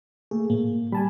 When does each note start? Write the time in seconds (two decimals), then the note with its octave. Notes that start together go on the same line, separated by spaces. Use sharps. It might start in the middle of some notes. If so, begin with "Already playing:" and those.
0.31 A3 A#3 G#4
0.50 A2 A#3
0.92 G3 G#5 A5 B5